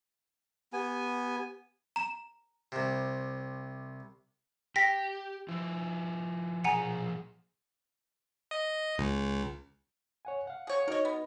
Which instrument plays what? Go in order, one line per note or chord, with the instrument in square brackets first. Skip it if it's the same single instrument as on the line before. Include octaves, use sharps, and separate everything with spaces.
[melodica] B3 G#5 [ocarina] G4
[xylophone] A#5 E7
[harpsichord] C2 C3
[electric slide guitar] G4 [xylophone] G5 A#6 B6
[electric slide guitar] F3 E4
[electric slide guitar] A#2 F3 G#4 [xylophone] F#5 G#5 A#5
[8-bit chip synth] D#5
C#2
[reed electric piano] C#5 F#5 G#5
F5 F#5
[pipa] G#4 C#5
[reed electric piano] D#4 F#4 D#5 [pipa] A#4 C#5
[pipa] B3